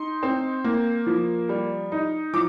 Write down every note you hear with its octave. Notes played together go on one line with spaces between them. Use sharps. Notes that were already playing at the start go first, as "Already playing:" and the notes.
Already playing: D#4 C6
C4
A#3
F3
G3
D#4
F3 D6